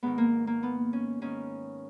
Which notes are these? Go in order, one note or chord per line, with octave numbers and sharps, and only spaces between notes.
G#2 D#3 B3
A#3
A#3
B3
C#4
G#2 D#3 C#4